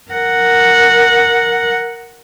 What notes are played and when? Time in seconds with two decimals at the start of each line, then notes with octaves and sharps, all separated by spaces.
0.12 A#4 F#5